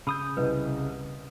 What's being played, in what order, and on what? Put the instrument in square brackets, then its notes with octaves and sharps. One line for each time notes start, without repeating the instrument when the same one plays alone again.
[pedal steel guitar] C#3 D#6 G6 [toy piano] B5 [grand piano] E6
[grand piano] C2 C3 [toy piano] B4 D#5